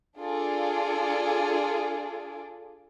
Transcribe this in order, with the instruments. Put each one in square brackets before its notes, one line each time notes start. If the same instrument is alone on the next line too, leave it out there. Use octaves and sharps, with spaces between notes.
[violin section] D4 F4 G#4 A4 D5